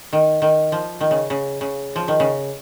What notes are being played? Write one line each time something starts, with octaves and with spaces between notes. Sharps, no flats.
D#3
D#3
F3
D#3
C#3
C#3
C#3
F3
D#3
C#3